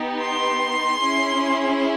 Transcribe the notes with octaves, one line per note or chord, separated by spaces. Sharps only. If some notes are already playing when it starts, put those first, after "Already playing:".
Already playing: B3 D#4 G4
C6
C#4 E4 G#4